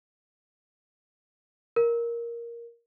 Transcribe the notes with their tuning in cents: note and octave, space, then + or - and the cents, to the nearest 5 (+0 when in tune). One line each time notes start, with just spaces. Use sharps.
A#4 +5